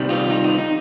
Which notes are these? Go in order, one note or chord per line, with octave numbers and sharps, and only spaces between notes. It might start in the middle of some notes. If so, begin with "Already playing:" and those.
Already playing: C2 C3 D#3 G3
F4
D#4
D#4
D#4